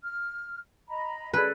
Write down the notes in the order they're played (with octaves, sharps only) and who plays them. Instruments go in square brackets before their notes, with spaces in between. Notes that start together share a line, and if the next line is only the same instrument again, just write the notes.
[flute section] F6
D#5 A#5 B5
[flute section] A4 C#5 D5 [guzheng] B4